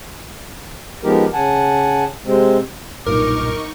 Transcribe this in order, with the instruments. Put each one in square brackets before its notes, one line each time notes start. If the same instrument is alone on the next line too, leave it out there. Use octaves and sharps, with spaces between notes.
[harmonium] F3 G#3 B3 D#4 G4 A#4
C#3 F#5 G#5 A5
C3 G#3 C4
[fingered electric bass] B1 G2 A#2 [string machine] D#4 C#6 [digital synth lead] A#4 [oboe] D6